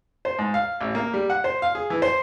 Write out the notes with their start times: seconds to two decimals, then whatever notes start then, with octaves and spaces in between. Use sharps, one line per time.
0.25 C5
0.39 G#2
0.54 F5
0.81 A1
0.95 A#3
1.14 G3
1.30 F#5
1.44 C5
1.62 F5
1.75 G#4
1.90 E3
2.02 C5